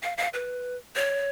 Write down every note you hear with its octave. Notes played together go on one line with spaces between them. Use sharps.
F5
F5
B4
C#5